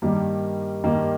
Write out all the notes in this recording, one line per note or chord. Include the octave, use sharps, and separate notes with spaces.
G2 D#3 G3 A#3
G2 D#3 G3 A#3